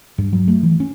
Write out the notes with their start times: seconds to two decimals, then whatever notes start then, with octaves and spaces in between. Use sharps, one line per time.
0.18 G2
0.33 F#3
0.48 A3
0.63 E3
0.80 C#4